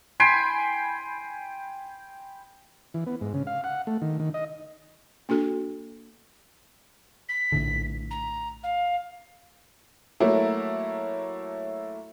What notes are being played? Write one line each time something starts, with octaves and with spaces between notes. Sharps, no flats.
G5 G#5 B5 C6
E3
B3
G#2
C#3
F5
F#5
A3
D#3
D#3
D#5
A#3 D4 F#4 A4
B6
A#1 A2 D3
A#5
F5
F#3 A3 A#3 E4